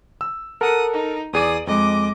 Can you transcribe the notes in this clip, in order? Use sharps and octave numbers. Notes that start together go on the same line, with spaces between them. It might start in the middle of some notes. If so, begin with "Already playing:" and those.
E6
A4 A#4 F#5 D#6
D#4
E2 G#4 D5 D#6 D#7
F2 G#3 D#5 D6